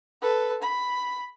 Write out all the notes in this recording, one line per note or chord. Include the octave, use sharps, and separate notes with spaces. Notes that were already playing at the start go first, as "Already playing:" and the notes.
A4 B4
B5